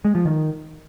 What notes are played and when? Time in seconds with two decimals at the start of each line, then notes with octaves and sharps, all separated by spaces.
0.05 G#3
0.15 F3
0.25 D#3